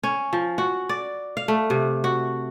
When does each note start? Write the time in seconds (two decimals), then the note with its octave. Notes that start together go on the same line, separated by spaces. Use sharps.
0.03 C#4
0.33 F3
0.58 F#4
0.89 D5
1.37 F5
1.48 A3
1.70 C3
2.04 F#4